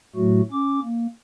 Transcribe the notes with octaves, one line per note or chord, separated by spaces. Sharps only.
A2 F#3 A3 F#4
C#4 D6
A#3